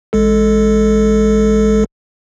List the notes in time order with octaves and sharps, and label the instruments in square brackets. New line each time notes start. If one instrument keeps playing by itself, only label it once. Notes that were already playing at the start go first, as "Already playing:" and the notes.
[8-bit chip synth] A1 G#3 A4